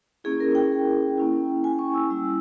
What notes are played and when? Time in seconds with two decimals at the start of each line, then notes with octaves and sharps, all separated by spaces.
0.24 A#3 C#4 E4 G#4
0.40 A#4
0.55 G5
1.18 A#3 C#4 E4
1.64 G#5
1.79 C#6
1.95 E6
2.10 G3 C#4 E4 E6